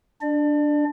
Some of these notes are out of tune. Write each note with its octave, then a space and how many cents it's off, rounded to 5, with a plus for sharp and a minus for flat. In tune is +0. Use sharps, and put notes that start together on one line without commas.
D4 +0 D5 +35